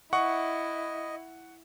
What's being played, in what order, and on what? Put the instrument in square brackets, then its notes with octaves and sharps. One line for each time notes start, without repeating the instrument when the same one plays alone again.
[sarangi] E4 [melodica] D#5 [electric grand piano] F#5 C#6